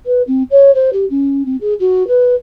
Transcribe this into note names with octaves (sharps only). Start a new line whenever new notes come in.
B4
C4
C#5
C5
G4
C#4
C4
G#4
F#4
B4